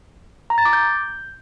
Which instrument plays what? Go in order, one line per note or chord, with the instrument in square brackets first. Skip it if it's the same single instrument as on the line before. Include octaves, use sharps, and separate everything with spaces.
[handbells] A#5
A6
D6
G6